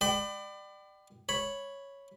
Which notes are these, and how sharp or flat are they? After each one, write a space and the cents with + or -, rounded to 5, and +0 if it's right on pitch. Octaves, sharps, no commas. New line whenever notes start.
D5 +30 G5 -25 B5 +25
C#5 +0 B5 +0